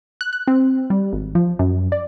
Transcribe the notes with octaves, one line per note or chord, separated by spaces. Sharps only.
F#6
F#6
C4
G3
G#1
F3
F#2
D5